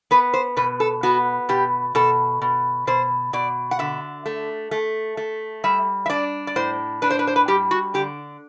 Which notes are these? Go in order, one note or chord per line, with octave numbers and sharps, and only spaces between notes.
B3 B4
C5
B2 B4
A4
B3 F#4
B2 G4
B2 A4
B2
B2 C5
B2 D5
F#5
D3 E5
A3
A3
A3
G3 E5
E5
D4 D5
D5
A2 C5
D4 B4
C5
B4
C5
B4
G3 G4
F#4
D3 G4